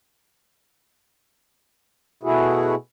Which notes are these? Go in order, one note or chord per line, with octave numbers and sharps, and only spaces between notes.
B2 A3 E4 F#4 G#4